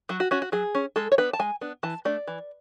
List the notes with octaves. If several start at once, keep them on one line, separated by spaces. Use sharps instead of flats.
F#3 F#4
F#4
C#4 F#4
F#4
F#3 G#4
C#4
G#3 A4
C#5
B3 D4 B4
A5
G#3 G#5
B3 D4
E3 A5
A3 D4 D5
E3